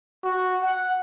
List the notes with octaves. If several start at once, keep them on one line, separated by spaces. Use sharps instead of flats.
F#4
F#5